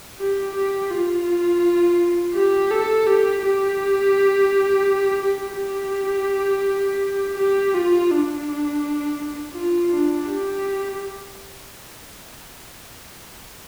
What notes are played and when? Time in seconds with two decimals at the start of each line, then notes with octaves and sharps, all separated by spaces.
0.19 G4
0.55 G4
0.91 F4
2.34 G4
2.71 A4
3.07 G4
3.43 G4
5.22 G4
5.58 G4
7.38 G4
7.74 F4
8.11 D4
9.54 F4
9.90 D4
10.27 G4